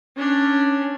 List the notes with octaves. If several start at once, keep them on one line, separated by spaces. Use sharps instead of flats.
C#4 D4